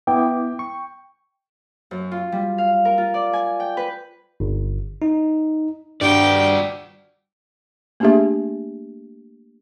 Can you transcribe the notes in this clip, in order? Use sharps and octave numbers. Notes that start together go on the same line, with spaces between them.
B3 E4 G5 D6
C#6
F#2
F4
G3
F5
A#4
F4
D5
G#5
G5
B4
G1
D#4
G2 F#4 D5 G5
A3 A#3 D4 G4 G#4 E5